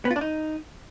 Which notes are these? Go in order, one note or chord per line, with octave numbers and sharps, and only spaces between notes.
B3
F4
D4
D#4